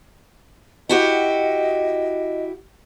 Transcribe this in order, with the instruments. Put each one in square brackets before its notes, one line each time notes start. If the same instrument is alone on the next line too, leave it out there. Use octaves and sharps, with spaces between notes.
[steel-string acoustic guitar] E4 F#4 G4 [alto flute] D#5